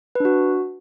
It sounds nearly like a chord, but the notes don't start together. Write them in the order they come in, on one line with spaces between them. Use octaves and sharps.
B4 D4 F#4